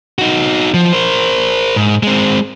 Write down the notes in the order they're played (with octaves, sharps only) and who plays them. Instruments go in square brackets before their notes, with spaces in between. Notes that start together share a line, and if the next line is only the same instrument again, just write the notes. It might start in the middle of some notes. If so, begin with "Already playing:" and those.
[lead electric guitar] D#4 F#4
F3
A#4 C5
G#2
G#3 C4